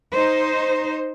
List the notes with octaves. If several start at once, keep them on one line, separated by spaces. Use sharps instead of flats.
D#4 C5